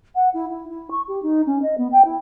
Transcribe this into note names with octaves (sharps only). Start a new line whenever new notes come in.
F#5
E4
E4
E4
C#6
G4
D#4
C#4
D#5
B3
G5
E4